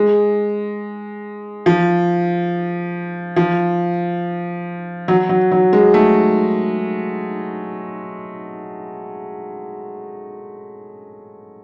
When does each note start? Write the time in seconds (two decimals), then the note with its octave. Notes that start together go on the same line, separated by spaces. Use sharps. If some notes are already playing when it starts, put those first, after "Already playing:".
Already playing: G#3
1.66 F3
3.36 F3
5.08 F#3
5.29 F#3
5.51 F#3
5.73 G#3
5.94 A3